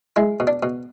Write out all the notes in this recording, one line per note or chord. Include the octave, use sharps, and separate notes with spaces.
G#3 E4
B2
D4
B2